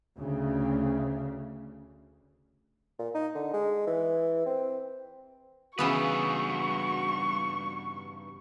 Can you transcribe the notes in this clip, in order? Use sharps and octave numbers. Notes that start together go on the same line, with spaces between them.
D2 C#3
A#2
D#4
D3
G#3
E3
C4
G2 C#3 E3 B3 D#4 F#4 B4 C#6